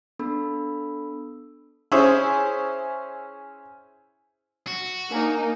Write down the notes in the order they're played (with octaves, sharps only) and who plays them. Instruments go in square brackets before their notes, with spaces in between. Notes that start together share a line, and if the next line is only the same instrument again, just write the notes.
[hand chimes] B3 D4 A4 B5 E6
[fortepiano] C#4 E4 G#4 C5 E5 D#6
[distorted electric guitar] F#4
[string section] A#3 D#4 [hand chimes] D4 A#4 G#5